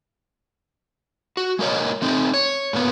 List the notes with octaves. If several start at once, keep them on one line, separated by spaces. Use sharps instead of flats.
F#4
G#3 A#3 A#4 C#5 D#5
A3 C4 D#4
C#5
G#2 A#3 B3